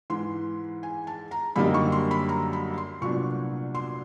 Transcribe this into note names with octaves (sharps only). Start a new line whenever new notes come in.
G#2 E3 G#3 C6
G#5
A5
A#5
F#2 D3 G3 A#3 D#4 B5
C#6
C6
B5
A#5
B5
C6
C2 A#2 F#3 B3 D4 C#6
C6